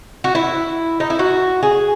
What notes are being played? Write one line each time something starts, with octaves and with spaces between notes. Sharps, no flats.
F#4
E4
D#4
E4
F#4
G#4